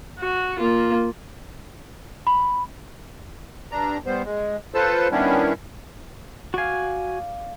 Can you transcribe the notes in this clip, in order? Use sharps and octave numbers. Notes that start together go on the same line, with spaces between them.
F#4
A#3 F4
B5
G2 D4 A#5
G3 B3 C5
G#3
F4 A4 B4 C5 A5 E6
D#3 G3 B3 C#4 D4 E4
F#4 D5 F5 G#5